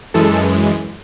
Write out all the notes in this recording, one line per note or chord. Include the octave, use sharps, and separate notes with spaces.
F#2 E3 G#3 A4